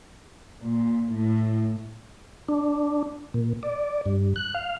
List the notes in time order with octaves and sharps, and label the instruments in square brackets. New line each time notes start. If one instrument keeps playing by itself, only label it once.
[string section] A#2
A2
[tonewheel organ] D4
A#2
D5
G2
F#6
F5